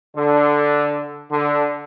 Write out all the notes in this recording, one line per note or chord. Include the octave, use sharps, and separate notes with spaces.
D3
D3